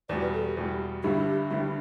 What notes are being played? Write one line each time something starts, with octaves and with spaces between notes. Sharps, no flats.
E2 B2 G3 D5
B4
A4
G4
E2 B2 G3
G1 G2 D3 G3 E4 G4
G1 G2 D3 G3 D4 E4